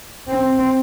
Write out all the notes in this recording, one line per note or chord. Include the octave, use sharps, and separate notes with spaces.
C4